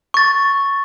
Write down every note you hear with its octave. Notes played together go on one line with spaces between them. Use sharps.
C#6 A6